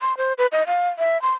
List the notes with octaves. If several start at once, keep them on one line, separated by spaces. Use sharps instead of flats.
C6
C5
B4
D#5
F5
E5
C6